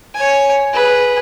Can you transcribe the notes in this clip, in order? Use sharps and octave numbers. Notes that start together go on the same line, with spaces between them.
C#5 G#5
G#4 B4